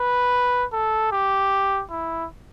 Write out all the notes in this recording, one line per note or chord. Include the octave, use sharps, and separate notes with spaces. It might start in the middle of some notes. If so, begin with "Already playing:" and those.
Already playing: B4
A4
G4
E4